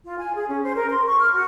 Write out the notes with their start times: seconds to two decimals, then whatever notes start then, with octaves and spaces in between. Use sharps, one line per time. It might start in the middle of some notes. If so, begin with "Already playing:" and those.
0.05 F4
0.18 G#5
0.34 G#4
0.49 C#4
0.63 C5
0.75 A#4
0.90 C6
1.06 C#6
1.20 F6
1.33 F#4